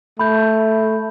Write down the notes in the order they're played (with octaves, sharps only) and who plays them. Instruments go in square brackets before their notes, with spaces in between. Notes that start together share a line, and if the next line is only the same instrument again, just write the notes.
[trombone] A3 [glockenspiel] B5 G6